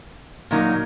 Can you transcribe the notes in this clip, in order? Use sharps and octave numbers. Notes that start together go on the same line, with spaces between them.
A#2 F#3 A#3 D#4